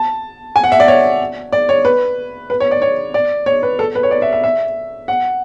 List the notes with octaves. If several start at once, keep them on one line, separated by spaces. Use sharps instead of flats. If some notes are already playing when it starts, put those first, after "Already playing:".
Already playing: A5
G#5
F#5
E5
D5
C#5
D5
C#5
B4
B4
C#5
D5
C#5
D5
C#5
B4
A4
B4
C#5
D5
E5
E5
E5
F#5